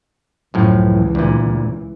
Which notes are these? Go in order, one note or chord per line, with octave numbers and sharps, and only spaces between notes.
C#2 F#2 A2 E3 F3
D2 A#2